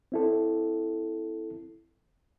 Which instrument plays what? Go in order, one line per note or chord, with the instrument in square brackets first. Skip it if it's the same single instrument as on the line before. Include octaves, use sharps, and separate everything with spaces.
[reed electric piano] C4 E4 A4